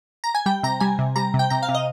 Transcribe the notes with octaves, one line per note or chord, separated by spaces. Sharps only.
A#5
G#5
G3 G5
C3 A#5
G3 G#5
C3
G3 A#5
C3
G5
C3 A#5
F5
C3
D#5